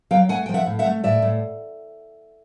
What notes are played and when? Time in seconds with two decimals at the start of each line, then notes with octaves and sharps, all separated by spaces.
0.11 F#3 F5 G5
0.29 A3 F#5 G#5
0.46 F3 G5
0.54 E5 F#5
0.66 A2
0.79 E5 F#5
0.86 A3
1.04 A2 D5 E5
1.22 A2